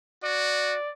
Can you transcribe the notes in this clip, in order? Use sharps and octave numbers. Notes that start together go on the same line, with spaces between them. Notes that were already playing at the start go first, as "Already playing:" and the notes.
F#4 D5